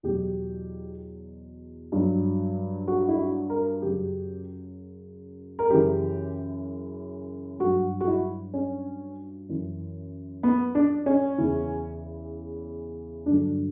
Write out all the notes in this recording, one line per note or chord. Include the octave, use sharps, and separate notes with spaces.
E2 B2 F#3 G4
G2 F#3
F#4
E4
F#4
A#4
F#2 C#3 F#3 G4
A#4
F#2 C#3 E3 G4
G2 F#3 F#4
F#4
E4
C#4
F#2 E3
B3
D4
C#4
E2 C#3 E3
G2 D3 F#3 D4